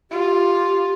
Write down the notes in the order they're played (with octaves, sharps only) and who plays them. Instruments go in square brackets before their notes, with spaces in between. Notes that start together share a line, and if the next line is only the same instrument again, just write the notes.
[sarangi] F4 [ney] G4